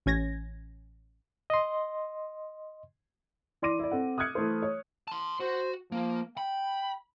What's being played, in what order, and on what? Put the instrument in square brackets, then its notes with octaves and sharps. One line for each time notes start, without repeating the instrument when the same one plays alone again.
[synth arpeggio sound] A1 C#4 G#6 A#6
[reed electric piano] D#5 C6
[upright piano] E3 D5 C6 D6 A#6 D#7
E4 D5
C4 A4 F#5
D#6 F6 F#6 G#6 C#7
E3 A3 E4 C5
C#5
[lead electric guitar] A5 C6
[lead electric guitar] F#4 [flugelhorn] C5
[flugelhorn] F3 [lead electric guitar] A#3
[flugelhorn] G5 [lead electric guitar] B5